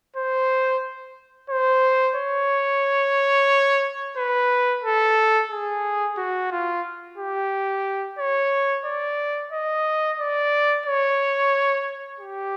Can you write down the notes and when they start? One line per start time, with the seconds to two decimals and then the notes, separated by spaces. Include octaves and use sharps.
0.16 C5
1.50 C5
2.16 C#5
4.17 B4
4.84 A4
5.51 G#4
6.17 F#4
6.51 F4
7.18 G4
8.19 C#5
8.85 D5
9.52 D#5
10.19 D5
10.86 C#5
12.20 G4